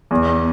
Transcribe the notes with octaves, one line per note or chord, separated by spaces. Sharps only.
E2